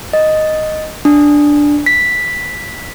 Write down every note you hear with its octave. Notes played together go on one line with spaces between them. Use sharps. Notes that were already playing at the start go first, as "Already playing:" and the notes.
D#5
D4
B6